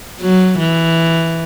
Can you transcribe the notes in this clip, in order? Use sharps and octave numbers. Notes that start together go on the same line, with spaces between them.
F#3
E3